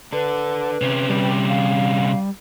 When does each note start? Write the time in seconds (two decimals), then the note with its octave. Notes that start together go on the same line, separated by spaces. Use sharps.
0.12 D4 A4 B4
0.81 C3 C#4
1.09 G3
1.49 F5